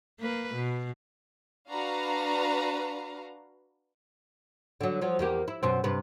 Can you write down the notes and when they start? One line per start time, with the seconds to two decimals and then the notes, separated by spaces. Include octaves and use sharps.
0.20 A#3 B4
0.55 B2
1.68 D4 F#4 B4 F5 A#5
4.81 D3 F#3
5.01 F3 F#3
5.19 E2 A#3 G4
5.48 E4
5.63 F#2 B2 C4
5.84 G2 C3 B4